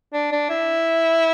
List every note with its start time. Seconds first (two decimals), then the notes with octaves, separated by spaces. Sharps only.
0.13 D4
0.32 D4
0.49 E4